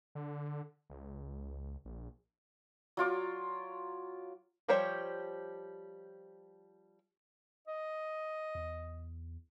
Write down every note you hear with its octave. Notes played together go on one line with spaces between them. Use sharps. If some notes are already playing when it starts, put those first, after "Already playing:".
D3
C#2
A#1
F#3 F4 D6
F3 G3 G4 C5 C#5
D#5
E2